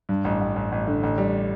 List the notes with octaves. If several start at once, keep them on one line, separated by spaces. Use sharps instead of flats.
G2
A1
A1
A1
A1
D3
A1
G3